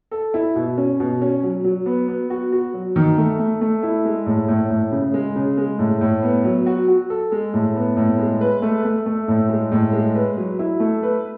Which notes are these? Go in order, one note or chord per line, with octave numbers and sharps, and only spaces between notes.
A4
E4
B2
C#4
B2
C#4
F#3
F#3
B3
B3
F#4
F#4
F#3
D#3
A3
A3
A3
E4
G#3
A2
A2
A2
C#3
G#3
C#3
G#3
A2
A2
B3
F#3
F#4
F#4
A4
G#3
A2
B3
A2
G#3
B4
A3
A3
A3
A2
G#3
A2
G#3
B4
F#3
E4
A3
B4